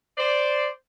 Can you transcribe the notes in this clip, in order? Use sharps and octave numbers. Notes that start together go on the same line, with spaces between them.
C5 D5